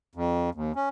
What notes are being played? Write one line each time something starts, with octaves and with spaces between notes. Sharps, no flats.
F2
D#2
C#4